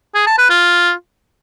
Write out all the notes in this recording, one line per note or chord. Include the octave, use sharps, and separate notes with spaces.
G#4
A5
B4
F4